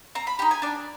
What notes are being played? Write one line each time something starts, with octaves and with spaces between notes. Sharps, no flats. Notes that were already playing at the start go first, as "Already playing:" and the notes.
C4 A#5
B5
D#4 G4 A#5
G#5
D4 D5